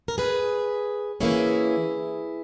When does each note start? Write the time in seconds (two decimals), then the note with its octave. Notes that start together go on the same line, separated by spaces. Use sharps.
0.08 A#4
0.18 G#4 B4
1.21 E3 A#3 C#4 E4 G#4